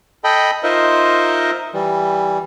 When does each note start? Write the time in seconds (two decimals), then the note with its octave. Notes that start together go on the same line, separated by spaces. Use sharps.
0.24 A4 D#5 G5 B5
0.63 D#4 F4 A#4 C5 D#5 E5
1.74 E3 G3